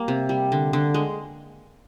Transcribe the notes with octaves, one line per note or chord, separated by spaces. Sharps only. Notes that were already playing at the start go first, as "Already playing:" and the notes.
Already playing: G3 A#3
C3
G3
D3
D3
G#3